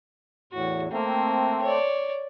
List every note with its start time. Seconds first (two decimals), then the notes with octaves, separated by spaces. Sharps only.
0.53 E2 A2 F#4
0.91 A3 A#3 C4
1.62 C#5 D5